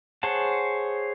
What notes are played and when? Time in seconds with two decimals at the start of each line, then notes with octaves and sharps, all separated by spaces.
0.23 G#4 C5 C#5 F#5 A5